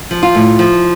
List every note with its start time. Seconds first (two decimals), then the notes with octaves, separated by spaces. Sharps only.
0.11 F3
0.23 F4
0.35 A2
0.59 F3